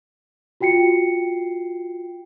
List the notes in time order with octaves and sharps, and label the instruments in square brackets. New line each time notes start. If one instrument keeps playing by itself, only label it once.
[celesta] F4 F#4 G5 C7 C#7